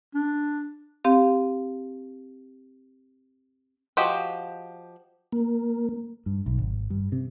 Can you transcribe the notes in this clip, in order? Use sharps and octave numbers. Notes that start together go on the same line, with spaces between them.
D4
C4 G4 F5
F3 F#4 G4 D#5
A#3
G2
B1
G#1
G2
C3